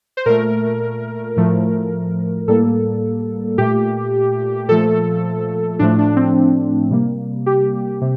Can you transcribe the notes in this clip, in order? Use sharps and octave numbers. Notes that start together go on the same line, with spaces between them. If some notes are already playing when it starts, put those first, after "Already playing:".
C5
A#2 A3 A#4
A2 F3 A3
A2 G3 A#3 A4
A#2 A3 G4
A#2 F3 A3 A4
A2 F3 A3 D4
D4
C4
C3 G3 A#3
G4
C3